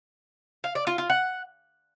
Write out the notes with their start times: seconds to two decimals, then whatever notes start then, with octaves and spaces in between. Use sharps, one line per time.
0.64 F5
0.75 D5
0.87 F4
0.98 F4
1.10 F#5